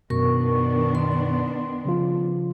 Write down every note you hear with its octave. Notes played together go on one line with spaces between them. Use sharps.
F#2 B2 D#3 B3 D4 A#4 C#6
C6
C#3 F3 F4